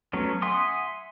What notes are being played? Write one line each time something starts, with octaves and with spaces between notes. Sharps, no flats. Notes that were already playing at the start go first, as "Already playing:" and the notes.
F#3 A3 B3 C#4
E5 F#5 G#5 C6 D#6